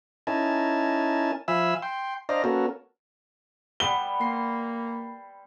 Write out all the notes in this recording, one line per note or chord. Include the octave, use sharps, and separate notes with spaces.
C#4 D#4 E4 A#4 G#5 A5
F3 E5 F5 G#5 B5 E6
G5 C6
D4 C5 D5 D#5 F5 A#5
A#3 B3 C#4 F#4 A4 A#4
G3 B3 G7
A#3 C6